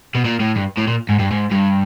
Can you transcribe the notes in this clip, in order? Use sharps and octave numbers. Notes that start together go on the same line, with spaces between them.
B2
A#2
A2
G2
A2
A#2
G#2
G2
G#2
G2